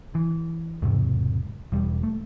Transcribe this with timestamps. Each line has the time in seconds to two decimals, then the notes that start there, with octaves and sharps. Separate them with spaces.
0.15 E3
0.82 E1 G#2 C3
1.72 E1 G3
2.03 A3